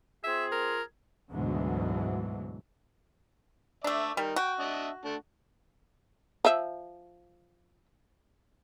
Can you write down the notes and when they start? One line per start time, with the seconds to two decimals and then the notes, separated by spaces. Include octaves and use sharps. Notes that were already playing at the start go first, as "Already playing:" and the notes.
0.24 C4 F4 G#4 E5
0.52 A#4
1.31 D2 G#2 B2 D3 E3 F#3
3.84 A3 D4 D5 E5
4.17 G3 D#4 A#4
4.36 F#4 G5
4.60 D4 D#5 E5
5.05 A3 D4
6.45 F3 E5